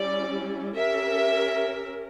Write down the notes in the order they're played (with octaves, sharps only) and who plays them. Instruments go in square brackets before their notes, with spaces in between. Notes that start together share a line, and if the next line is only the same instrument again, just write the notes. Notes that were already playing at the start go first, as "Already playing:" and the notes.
Already playing: [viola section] G3 C#4 E4 [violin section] D5
[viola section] C#4 G4 A#4 [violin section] E5